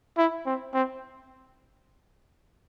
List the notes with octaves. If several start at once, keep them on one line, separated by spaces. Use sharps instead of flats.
E4
C4
C4